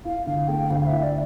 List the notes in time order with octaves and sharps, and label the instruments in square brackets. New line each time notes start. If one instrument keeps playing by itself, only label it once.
[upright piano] E4 [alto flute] F5
[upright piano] D3 [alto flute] F5
[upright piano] A3 [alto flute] G5
[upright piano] D2 [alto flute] F5
[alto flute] F5
E5
[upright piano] E4
[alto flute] D5